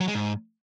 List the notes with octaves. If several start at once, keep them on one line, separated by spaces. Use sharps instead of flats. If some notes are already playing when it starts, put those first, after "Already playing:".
F#3
G#3
G#2